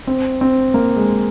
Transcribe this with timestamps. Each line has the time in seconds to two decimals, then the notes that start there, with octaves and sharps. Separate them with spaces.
0.07 C4
0.41 C4
0.74 A#3
0.96 G#3